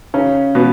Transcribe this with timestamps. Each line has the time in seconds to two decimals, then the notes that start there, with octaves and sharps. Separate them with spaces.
0.14 C#3 C#4
0.55 B2 B3